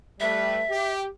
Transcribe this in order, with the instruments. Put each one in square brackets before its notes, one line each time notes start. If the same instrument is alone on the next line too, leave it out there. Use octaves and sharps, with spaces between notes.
[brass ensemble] G3 A3 B4 [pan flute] E5
[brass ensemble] G4